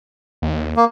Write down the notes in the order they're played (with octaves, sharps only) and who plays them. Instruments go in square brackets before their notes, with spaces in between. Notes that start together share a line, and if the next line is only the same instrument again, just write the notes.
[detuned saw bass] D#2
[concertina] A#3